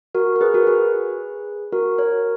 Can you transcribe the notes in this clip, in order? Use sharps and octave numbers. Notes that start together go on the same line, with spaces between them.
F#4 A#4
A#4
G#4 B4
F#4 A#4
G#4 B4
F#4 A#4
A#4 C#5